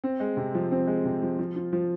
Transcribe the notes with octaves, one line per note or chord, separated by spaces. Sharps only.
C4
G#3
C3
F3
C4
G#3
C3
F3
F3
F4
F3